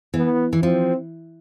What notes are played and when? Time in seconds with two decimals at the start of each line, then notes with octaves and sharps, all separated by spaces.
0.14 E3 B3
0.53 E3
0.62 F3 C4